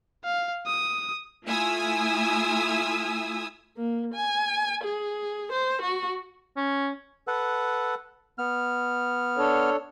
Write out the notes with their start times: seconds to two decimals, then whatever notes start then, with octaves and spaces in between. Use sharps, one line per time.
0.25 F5
0.66 D#6
1.46 A3 E4 F4 G#5 D#6 E6
3.77 A#3
4.14 G#5
4.84 G#4
5.52 C5
5.82 F#4
6.57 C#4
7.27 A4 B4 F#5
8.38 B3 F6
9.37 D4 A4 C#5